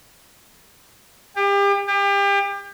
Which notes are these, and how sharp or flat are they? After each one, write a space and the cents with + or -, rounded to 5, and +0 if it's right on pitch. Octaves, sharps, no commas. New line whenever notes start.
G4 +35
G4 +35